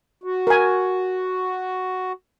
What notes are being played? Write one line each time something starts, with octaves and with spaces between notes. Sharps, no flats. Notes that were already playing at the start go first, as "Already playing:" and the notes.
F#4
A#4 G#5